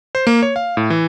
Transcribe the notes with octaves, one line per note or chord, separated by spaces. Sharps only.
C5
A#3
C#5
F5
A2
E3